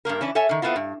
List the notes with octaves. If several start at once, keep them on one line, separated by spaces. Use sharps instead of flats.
G2 B2 A#3 A#4
E3 C#4 D4 E4
A4 C#5 E5 G#5
D3 D#3
A3 B3 C4 E4 F4
G2